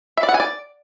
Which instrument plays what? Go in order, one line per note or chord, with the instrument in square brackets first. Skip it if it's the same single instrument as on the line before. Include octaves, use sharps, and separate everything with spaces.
[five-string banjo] E5
D5
F#5
G#5
D5